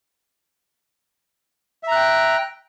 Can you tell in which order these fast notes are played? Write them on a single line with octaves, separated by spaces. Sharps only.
E5 A#5 F#6 G5